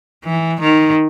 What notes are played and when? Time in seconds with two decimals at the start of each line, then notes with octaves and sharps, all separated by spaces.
0.24 E3
0.60 D#3